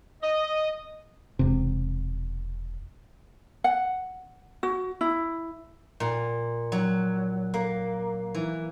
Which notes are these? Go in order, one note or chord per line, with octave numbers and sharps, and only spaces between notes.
D#5
E1 C3
F#5
F#4
E4
A#2
F#3
A#3
E3